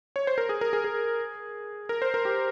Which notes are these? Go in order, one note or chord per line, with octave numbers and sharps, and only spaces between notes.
C#5
C5
A#4
G#4
A#4
G#4
G#4
A#4
C5
A#4
G4